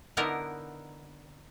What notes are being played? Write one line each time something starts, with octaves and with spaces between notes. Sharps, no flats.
D3 B3 D#4 E4 A#4